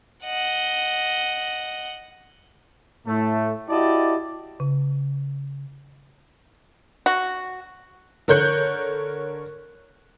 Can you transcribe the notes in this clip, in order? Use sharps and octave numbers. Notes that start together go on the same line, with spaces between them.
D#5 F#5
A2 A3
E4 F#4 G4 D5 D#5 A5
C#3
F#4
D3 A#4 C#5 F#6 G6 C#7